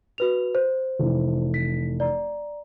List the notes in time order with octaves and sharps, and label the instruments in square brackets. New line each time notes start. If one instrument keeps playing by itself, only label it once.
[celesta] F#4 B4 F7
C5
[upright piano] F1 E3
[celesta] B6
D5 A#5